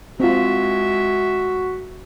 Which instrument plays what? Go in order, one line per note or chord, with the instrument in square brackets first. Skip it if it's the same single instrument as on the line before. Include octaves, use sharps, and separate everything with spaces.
[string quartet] G#3 E5 [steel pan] C4 F4 [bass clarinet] F#4